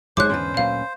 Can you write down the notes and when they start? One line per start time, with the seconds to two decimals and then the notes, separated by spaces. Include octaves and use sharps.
0.17 D1 G#1 G#2 G#3 C5 C#5 D6 F#6
0.29 E2 G#2 D3 C#4 B4 C5
0.57 D2 A#2 F#3 F5